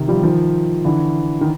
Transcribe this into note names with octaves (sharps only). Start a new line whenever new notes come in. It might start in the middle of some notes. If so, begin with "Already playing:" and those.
Already playing: C3 D#3
F3 G3
D#3 F3
D3 E3
D#3